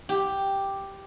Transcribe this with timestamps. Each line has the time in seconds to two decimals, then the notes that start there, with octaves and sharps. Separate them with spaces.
0.09 G4